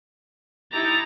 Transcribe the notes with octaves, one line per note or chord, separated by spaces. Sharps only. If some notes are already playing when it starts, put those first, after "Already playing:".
D#4 E4 G4 A#5 A6